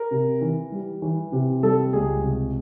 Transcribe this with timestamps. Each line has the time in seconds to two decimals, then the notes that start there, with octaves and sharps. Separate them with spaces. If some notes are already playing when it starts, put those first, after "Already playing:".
Already playing: A#4
0.11 C3
0.41 E3
0.72 G3
1.02 E3
1.32 C3
1.63 G3 A4
1.93 C#2 G#4
2.23 C3